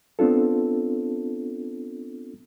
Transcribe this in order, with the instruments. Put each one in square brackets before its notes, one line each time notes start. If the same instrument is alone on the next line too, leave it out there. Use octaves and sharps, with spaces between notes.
[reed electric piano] B3 C4 D4 F4 A4